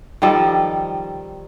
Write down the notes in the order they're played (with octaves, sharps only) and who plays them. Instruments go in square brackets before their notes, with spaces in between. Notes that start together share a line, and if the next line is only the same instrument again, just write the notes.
[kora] D#3 F3 G3 A4